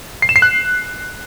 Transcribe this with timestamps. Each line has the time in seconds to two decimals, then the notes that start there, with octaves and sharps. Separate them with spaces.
0.22 C7
0.29 E7
0.36 C7
0.42 F#6